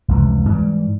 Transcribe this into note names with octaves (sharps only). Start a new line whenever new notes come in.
F1 C#2 E3
G#2 E3 G3